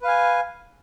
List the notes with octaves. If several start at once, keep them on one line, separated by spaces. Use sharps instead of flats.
B4 F5 G#5